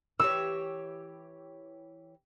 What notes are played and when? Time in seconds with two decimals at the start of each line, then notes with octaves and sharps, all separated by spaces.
0.19 E3 G4 C#5 E6